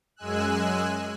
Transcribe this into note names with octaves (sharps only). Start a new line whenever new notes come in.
F#2 G#3 G#5 E6 F#6